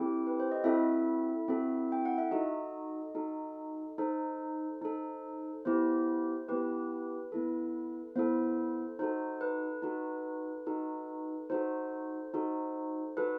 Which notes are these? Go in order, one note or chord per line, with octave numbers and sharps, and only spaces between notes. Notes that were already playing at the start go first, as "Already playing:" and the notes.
Already playing: C4 E4 G4 A4 G5
B4
C5
D#5
C4 E4 F#4 A4 E5
C4 F#4 A4
G5
F#5
E5
D#4 F#4 A4 D#5
D#4 F#4 A4
D#4 A4 C5
D#4 A4
B3 E4 G4 C5
B3 E4 G4 B4
B3 E4 A4
B3 E4 A4 C5
D#4 F#4 A4 C5
B4
D#4 F#4 A4
D#4 F#4 A4
D#4 F#4 A4 C5
D#4 F#4 A4
D#4 F#4 A4 B4